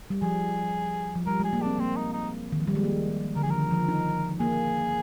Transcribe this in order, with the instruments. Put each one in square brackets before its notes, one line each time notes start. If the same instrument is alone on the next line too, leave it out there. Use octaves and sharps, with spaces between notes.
[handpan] G3
[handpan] F3 [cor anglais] G#4
[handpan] F3
[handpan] G3 [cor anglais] A#4
[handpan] G#3 [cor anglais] G#4
[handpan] A#3
[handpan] C4 [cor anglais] D4
[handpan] A#3 [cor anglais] C4
[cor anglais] D#4
D#4
[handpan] D#3
F3
G3
G#3
A#3
[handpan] D3 [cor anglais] A#4
[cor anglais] G#4
[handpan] F3
[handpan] D#3 [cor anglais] A#4
[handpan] F3
D#4
[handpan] A#3 [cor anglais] G#4